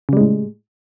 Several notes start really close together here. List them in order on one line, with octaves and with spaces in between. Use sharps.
C#3 G3 G#3 A2